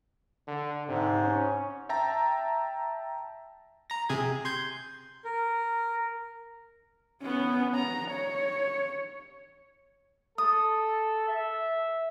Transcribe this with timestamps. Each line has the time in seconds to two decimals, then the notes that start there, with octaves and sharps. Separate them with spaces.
0.48 D3
0.88 G#2 C3
1.24 C#4
1.89 E5 G5 A5 A#5
3.90 A#5 A#6
4.09 C3 G#4 G#6
4.45 C6 G6 G#6
5.25 A#4
7.22 B3 C#4
7.75 A#5
8.11 C#5
10.38 A4 D#6
11.29 E5